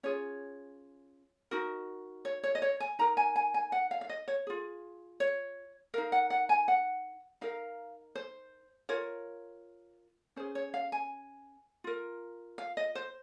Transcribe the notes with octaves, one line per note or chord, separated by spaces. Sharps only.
C#4 F4 G#4 C#5
D#4 F#4 A#4
C#5
C#5
D#5
C#5
G#5
D#4 A#4 A#5
G#5
G#5
G#5
F#5
F5
F5
D#5
C#5
F4 G#4
C#5
D#4 A#4 F5
F#5
F#5
G#5
F#5
D#4 A#4 F5
C5
F4 A#4 C#5
C#4 G#4 C5
C#5
F5
G#5
F4 A#4
F5
D#5
C5